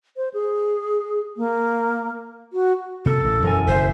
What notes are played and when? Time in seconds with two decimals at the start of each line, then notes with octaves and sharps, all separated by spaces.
0.17 C5
0.34 G#4
1.37 A#3
2.53 F#4
3.06 C3 A#3 A4 C#7
3.24 A1 A#3
3.43 E1 F#2 A#4 G#5
3.67 F#1 C5 E5 B6